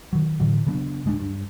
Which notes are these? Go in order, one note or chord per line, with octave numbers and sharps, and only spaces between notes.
D#3 F#3
A2 D3 E3 F#3
C#3 F#3 B3 D4
D1 G#3 C#4 D4
G2